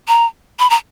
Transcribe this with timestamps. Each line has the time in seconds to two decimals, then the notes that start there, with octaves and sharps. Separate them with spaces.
0.08 A#5
0.59 B5
0.70 A#5